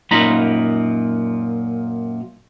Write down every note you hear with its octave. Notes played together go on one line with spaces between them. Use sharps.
F#2 A#2 D#4 F4 A#5 B5